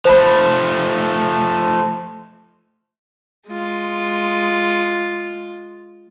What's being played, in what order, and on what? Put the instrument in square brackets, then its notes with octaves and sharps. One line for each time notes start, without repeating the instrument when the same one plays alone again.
[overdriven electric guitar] F3 A3 [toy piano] C5 A5 B5
[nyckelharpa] G#3 F4